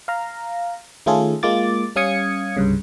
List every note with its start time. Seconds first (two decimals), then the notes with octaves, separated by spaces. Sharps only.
0.08 F5 A#5
1.06 D#3 A3 C#4 F4 G#4 A4
1.43 G#3 A#3 F4 D6 A6
1.96 G3 C#4 F5 D#6 G#6 C#7
2.57 C2 G2 C#3